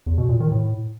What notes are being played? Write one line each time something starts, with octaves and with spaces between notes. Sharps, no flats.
E2
B2
A#2
D#3
A2